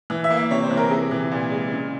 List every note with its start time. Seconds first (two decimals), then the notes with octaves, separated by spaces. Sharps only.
0.10 E3
0.24 E5
0.30 A#3
0.37 E5
0.51 C3 C#5
0.63 C5
0.71 E3
0.77 A#4
0.91 C3 G#4
1.11 E3
1.31 A#2
1.51 G#3
1.72 C#3